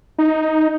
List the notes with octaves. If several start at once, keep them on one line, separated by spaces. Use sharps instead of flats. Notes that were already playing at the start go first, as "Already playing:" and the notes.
D#4